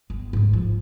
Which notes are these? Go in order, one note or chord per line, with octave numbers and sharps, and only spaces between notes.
G1
D2 G#2
F3